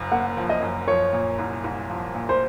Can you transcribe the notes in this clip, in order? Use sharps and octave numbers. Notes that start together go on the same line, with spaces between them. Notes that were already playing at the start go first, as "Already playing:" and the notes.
Already playing: F#1 F#2
A#3 F#5
F3
D#5
F#2
F3 C#5
A#2
C2
C2
F3
A#2
C5